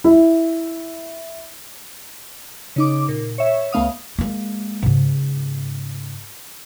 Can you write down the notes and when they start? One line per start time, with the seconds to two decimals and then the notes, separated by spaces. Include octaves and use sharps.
0.04 E4
2.76 C#3 D#4 D6
3.08 A#2
3.38 C#5 E5
3.72 C#2 A3 B3 F5 D#6
4.19 G#3 A#3
4.83 G#2 C#3